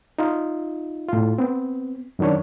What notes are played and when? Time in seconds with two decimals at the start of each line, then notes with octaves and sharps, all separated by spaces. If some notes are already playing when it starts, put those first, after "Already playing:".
0.18 D#4 F4
1.08 A2 F4
1.38 B3 C4
2.19 F#2 D#3 F#3 D4 C#5